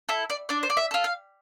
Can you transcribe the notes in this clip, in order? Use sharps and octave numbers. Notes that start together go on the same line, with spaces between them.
E4 A4
D5
D4 D5
C5
D5
E5
F4 A4
F5